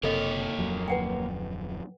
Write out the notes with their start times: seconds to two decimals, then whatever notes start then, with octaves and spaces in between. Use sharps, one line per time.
0.03 F#1 C3 A#3 A4 C#5 D#5
0.58 D1 F2 F#3
0.88 B4 F#5 G5